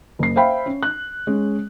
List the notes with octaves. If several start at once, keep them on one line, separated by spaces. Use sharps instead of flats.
F#1 C7
C5 E5 F5 G5 B5
C#4
F#6
G#3 C#4